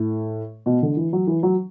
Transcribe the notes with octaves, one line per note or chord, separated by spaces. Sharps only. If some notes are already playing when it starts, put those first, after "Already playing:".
Already playing: A2
B2
D3
E3
F#3
E3
F#3